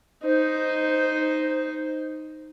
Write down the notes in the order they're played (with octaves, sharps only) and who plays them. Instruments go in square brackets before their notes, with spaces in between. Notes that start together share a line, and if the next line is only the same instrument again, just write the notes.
[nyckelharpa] D#4 C5